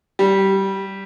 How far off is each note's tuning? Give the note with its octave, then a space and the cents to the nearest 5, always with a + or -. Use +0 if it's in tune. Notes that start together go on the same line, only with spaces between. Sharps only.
G3 -15